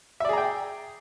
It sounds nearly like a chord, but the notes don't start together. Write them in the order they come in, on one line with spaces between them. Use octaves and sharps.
E5 D5 G#4 A#5 G5